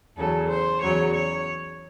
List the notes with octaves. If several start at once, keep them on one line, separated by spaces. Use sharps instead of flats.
E2 C#3 F#3 A4
C5
E2 C#3 F#3 C#5
C#5